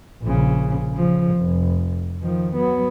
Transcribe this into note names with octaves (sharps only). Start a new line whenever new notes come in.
A#1 C#3
C#3 F3
F1
D#3 F3
F#3 B3